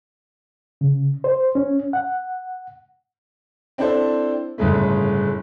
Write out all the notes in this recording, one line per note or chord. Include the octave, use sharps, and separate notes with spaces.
C#3
C5
C#4
F#5
C4 D4 E4 A4 C5
G1 A2 C#3 G#3 A3